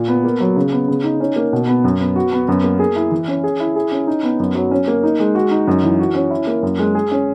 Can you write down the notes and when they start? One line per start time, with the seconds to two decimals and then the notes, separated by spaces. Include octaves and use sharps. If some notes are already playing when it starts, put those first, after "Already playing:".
Already playing: A#2
0.08 B3
0.24 A#3
0.40 F#3
0.56 C#3
0.72 B3
0.88 C#3
1.04 D#4
1.20 C#4
1.36 A#3
1.53 B2
1.67 B3
1.84 F#2
2.00 B3
2.16 F#4
2.32 B3
2.48 F#2
2.64 A#3
2.79 G#4
2.96 E4
3.11 E3
3.28 C#4
3.44 G#4
3.60 E4
3.76 G#4
3.91 C#4
4.07 D#4
4.23 B3
4.39 F#2
4.55 F#3
4.71 C#4
4.88 A#3
5.03 D#4
5.19 G#3
5.35 F#4
5.51 D#4
5.67 F#2
5.83 E3
5.99 F#4
6.14 C#4
6.31 E4
6.47 A#3
6.62 F#2
6.79 G#3
6.95 G#4
7.11 C#4